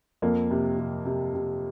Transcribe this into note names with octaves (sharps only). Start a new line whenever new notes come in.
F2 A#3
C3
C3
C3
C3